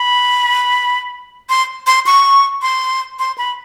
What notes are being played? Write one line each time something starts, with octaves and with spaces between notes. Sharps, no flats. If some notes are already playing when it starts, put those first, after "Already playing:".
Already playing: B5
C6
C6
C#6
C6
C6
B5